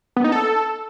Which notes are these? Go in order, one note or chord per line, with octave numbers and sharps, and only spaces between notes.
B3
D#4
A4